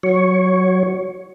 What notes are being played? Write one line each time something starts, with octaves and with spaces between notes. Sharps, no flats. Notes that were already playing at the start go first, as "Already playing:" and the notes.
F#3 C#5